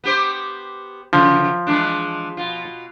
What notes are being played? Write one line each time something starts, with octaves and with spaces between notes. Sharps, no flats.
B3 G4 C5
F#2 C#3 F3
E3 G#3 D4
B2 F4